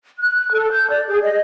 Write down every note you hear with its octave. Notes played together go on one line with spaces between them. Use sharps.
F#6
A4
G6
D5
G#4
D#5